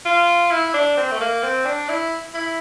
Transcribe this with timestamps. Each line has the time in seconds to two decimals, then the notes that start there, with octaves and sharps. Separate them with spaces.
0.05 F4
0.51 E4
0.74 D4
0.97 C4
1.12 A3
1.20 A#3
1.43 C4
1.66 D4
1.88 E4
2.34 E4